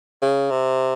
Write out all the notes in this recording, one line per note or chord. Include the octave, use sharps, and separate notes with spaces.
C#3
C3